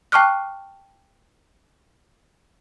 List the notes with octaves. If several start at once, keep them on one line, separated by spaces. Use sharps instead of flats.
G5 A5 C#6 D6 F6 F#6